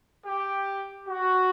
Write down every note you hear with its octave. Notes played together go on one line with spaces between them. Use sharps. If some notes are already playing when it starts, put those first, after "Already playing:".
G4
F#4